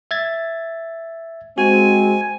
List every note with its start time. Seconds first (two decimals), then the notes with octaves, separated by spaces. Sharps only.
0.11 E5 G#6 A6
1.58 G#3 C4 F#4 G#5